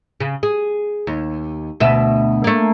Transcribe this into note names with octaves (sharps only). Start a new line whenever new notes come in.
C#3
G#4
D#2
D2 B2 E5
A3 A#3